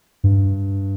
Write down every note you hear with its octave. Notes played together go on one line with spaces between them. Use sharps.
G2